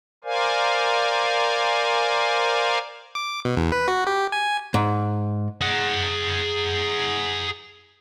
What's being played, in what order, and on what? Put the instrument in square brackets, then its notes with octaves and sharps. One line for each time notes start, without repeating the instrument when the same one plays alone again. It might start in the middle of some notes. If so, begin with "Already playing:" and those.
[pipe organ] A#4 C5 D5 F5 G#5
[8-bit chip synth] D6
B2
E2
B4
F#4
G4
G#5
[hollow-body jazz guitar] G#2
[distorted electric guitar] G#4 F#5